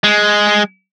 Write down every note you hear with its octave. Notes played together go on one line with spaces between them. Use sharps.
G#3